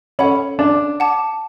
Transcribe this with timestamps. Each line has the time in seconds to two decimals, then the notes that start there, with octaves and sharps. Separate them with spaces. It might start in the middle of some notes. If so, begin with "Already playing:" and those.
0.19 C#4 A4 C#5 F#5 B5
0.59 D4
1.00 F#5 A5 D6